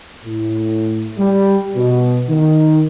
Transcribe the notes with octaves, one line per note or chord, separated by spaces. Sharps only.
A2
G3
B2
D#3